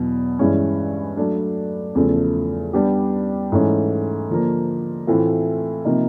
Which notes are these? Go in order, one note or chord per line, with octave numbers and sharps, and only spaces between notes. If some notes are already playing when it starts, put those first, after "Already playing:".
Already playing: E2 B2 F#3
G2 E3 G#3 C#4
F#3 A3 D4
E2 C#3 F3 A3
G3 B3 D4 G4
G#2 E3 A3 C#4
D3 F3 A#3
A2 E3 A3 C4 F4
C3 F3 A#3 D#4